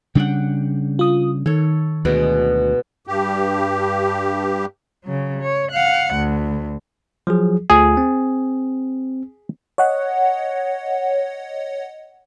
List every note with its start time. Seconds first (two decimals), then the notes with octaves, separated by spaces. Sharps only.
0.15 C#3 G3 D4 F#5 G5
0.99 F4 D#6
1.46 D#3 A4 C#5
2.05 D2 B2 G#3 D5
3.07 G2 G4
5.04 C#3 F#3
5.42 C#5
5.72 F5 F#5
6.15 D2
7.27 F3 F#3 G#4
7.70 D2 A3 F4 G#4
7.97 C4
9.78 C#5 D#5 F#5